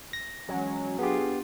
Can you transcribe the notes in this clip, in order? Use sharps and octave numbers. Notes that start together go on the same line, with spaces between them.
A#6
E3 F#3 G#3 C#4
B3 D4 F4 G4 G#4